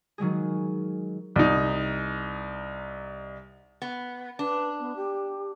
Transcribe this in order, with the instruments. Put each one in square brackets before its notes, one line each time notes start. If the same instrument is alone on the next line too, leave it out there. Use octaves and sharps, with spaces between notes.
[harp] D#3 F#3 G#3 G#4
[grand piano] C2 D#4
[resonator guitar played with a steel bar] B3
[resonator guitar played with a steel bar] D4 [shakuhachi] B4
[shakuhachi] B3
G4